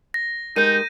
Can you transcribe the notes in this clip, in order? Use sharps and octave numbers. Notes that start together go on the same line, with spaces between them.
A#6
G#3 D#4 G4 A#4 G6 D#7